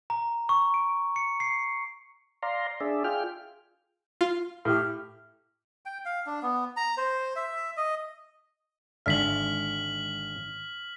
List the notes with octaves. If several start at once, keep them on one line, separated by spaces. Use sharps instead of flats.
A#5
C#6
D7
C#7
C7
D5 F5 A#5 C6
D4 G#4 D5 E5
F4 G#4 G5 F6
F4
A2 G4 F6
G5
F5
D4
B3
A#5
C5
E5
D#5
G#1 D3 E5 F6 B6 F#7